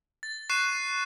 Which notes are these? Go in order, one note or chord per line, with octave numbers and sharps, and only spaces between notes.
A6
C#6 F#6 A6 C7 D#7 E7